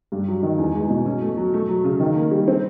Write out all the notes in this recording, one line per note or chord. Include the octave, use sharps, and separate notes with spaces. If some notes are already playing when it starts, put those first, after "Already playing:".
G2
F#3
D#3
E2
G#3
B2
C#4
A3
F#3
A3
F#3
C#3
D#3
A#3
G3
C4